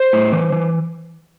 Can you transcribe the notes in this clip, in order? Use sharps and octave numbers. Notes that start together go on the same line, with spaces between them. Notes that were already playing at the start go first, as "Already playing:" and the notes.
Already playing: C5
A2
E3
E3